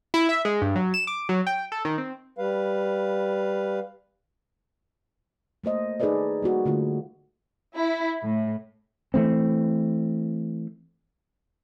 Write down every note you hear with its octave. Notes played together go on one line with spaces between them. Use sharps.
E4
E5
G#3
G2
F#3
E7
D6
F#3
G5
A4
D#3
C4
G3 B4 F5
A3 A#3 C5 D#5
D#4 G#4 A4 B4 D5 D#5
G3 A#3 F#4
D3 A3 F4
E4
A2
E3 A3 C4